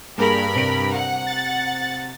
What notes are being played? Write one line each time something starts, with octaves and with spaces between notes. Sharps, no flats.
G2 A#3 G#4 A#4 B5
C3 D7
F#5
A6